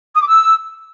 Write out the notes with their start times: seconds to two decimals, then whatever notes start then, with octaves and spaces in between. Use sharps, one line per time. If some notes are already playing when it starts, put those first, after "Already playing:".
0.15 D#6
0.21 D6
0.27 E6